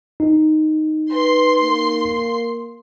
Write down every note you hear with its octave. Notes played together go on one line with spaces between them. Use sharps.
D#4
B4 C6 C7
A#3